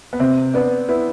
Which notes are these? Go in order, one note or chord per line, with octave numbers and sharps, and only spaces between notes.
B3
C3 C4
B3 D4
B3 E4